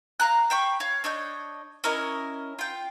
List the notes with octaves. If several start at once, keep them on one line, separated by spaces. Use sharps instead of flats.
F5 A5 A#5 F#6
C5 G5 B5 C#6
C#5 F5
D4 C#5 D#5 G6
C#4 E4 A#4 D#5
F4 G5